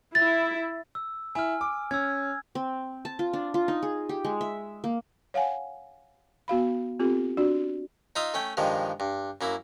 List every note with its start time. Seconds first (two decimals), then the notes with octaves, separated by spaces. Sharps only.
0.15 E4 A6
0.95 E6
1.35 E4 G#5 F6
1.61 D6
1.91 C#4 E6 G#6
2.55 C4
3.05 A5
3.19 F4
3.33 D4
3.54 F4
3.68 D#4
3.83 G#4
4.09 G4
4.24 G#3
4.41 E5
4.84 A#3
5.34 C#5 F5 F#5 G#5
6.48 B3 F#4 F5 B5
7.00 C4 F4 G4 A4
7.37 D4 F#4 D5
8.16 D#4 F4 E5 F5 D#6
8.34 A3 C#4 G5
8.57 G2 D#3 F3 G#3
9.00 G2
9.41 F#2 A#3 E4